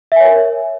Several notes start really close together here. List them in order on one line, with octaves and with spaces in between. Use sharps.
E5 G#5 C#5 A#4